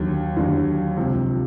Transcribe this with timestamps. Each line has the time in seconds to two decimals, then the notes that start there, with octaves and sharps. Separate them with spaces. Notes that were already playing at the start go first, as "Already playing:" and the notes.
Already playing: D#2 D3 F#3
0.37 D#2 D3 F#3
0.97 C#2 C3 F3